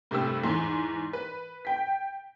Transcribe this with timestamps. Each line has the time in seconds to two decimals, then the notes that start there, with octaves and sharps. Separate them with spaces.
0.11 G2 C3 A3 C4 E6
0.44 E2 G#2 C6
1.13 B4
1.65 G5 B6